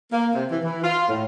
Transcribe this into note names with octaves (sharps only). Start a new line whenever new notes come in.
A#3
C3
E3
E3
F4
A2